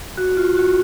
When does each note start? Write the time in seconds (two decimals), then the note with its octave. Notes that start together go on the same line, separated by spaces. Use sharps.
0.18 F#4
0.37 F4
0.57 F#4